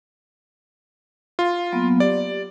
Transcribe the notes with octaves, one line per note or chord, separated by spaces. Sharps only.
F4
F#3 A#3 B3
G4 D5